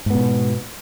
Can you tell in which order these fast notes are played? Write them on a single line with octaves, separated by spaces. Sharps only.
G#2 B3 B2